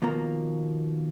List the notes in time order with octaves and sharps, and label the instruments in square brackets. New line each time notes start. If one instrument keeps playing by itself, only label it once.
[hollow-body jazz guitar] D#2 B2 F3 A#3 A#5